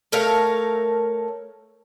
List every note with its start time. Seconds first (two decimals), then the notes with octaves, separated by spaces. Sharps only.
0.12 A3 A#4 C#5 F5